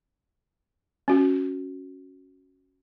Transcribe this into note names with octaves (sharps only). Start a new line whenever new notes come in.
C#4 F#4